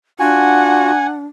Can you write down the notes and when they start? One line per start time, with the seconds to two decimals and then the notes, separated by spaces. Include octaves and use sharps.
0.20 D4 F4 F#4 F#5 G#5